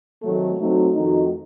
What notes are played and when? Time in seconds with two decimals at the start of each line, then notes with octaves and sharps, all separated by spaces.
0.22 C3 D#3 F#3 A3
0.57 F#3 A3 C4 D#4 F#4
0.93 F2 D#3 A3 D#4 F#4